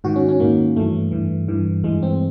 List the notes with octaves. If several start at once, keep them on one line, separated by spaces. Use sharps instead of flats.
G#2 D#3 F#4
C#4
C#4
G#2 D#3 A#3
G2 E3 A3
G2 E3
G2 E3
G2 E3 G#3
C4